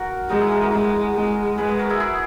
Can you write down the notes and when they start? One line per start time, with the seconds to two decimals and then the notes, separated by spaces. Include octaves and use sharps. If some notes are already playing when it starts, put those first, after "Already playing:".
Already playing: F#4 A#4
0.30 G#3 D#4 F#4
0.40 E4 G#4
0.51 F#4 A#4
0.62 F#4 A#4
0.72 G#3
1.15 G#3
1.58 G#3 G#4 B4
1.68 G#4 B4
1.79 F#4 A#4
1.90 E4 G#4
2.00 E4 G#4